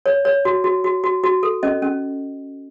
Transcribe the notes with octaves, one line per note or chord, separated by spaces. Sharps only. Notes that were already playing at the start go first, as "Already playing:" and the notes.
C#5
C#5
F#4
F#4
F#4
F#4
F#4
A4
C#4 D#5
C#4